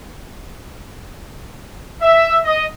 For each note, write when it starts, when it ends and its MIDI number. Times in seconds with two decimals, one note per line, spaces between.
2.01 2.38 76
2.44 2.63 75